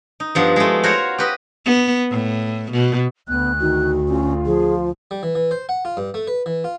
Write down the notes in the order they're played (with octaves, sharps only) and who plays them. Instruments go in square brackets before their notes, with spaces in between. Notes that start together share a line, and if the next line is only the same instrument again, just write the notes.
[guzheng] D#4
G2 F3 B3
G#3 A3
F#4 A#4 C5 C#5 F5
G4 B4 D#5
[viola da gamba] B3
A2
B2
[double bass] D2 [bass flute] B3 [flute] F#6
[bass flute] D#3 [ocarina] F#4
[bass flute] C#4 [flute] F4
[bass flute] F3 [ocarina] G#4
[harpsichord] G3
E3
E3
C5
F#5
F4
G2
A3
B4
E3
F4